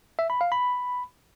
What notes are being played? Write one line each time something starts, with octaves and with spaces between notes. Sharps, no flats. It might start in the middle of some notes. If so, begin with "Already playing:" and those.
E5
B5
F5
B5